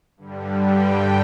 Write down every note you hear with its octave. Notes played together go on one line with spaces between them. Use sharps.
G2 D3 G3
G5